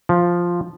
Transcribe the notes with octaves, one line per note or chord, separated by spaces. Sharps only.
F3